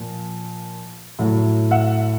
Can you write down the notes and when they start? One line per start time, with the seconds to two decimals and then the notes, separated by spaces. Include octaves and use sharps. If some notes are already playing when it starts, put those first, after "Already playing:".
Already playing: A#2 F3
1.19 A2 F#3
1.71 E5 F#5